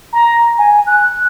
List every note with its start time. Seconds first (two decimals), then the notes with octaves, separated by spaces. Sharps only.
0.12 A#5
0.58 G#5
0.86 F#6